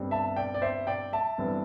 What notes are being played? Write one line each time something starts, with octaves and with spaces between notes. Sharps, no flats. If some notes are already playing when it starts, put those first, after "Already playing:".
Already playing: G1 G2 G3 C4
E5 A5
D5 G5
D5
C5 E5
D5 G5
E5 A5
G1 G2 E3 G3 C4